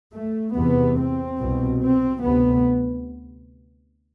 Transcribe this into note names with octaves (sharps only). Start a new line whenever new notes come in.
A3
E2 C3 B3
C4
C2 B2
C4
D2 C3 B3